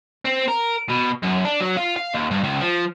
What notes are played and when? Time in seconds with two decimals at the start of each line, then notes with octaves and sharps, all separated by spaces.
0.25 C4
0.49 A#4
0.89 B2
1.22 F#2
1.45 D4
1.60 F#3
1.77 F4
1.97 F5
2.14 D#2
2.31 G2
2.44 C#2
2.61 F3